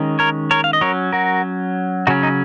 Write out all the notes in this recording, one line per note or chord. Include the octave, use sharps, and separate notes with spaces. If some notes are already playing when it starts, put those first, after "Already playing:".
Already playing: D#3 G#3 C#4
A#4 C#5
A#4 C#5
F5
D#5
F#3 C#4 A#4 C#5
F#4 A#4
C#3 F#3 C#4 D#4 F#4
D#4